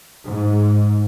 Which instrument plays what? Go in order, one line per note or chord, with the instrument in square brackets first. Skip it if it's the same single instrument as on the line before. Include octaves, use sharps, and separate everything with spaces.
[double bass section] G#2